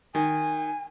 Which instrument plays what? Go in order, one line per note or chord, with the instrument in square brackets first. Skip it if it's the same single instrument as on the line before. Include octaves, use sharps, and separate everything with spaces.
[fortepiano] D#3 [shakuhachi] G#5